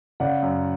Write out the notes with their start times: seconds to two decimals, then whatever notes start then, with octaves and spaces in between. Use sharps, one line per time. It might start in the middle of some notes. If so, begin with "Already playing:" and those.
0.20 C#3 D5 F#5
0.42 F#2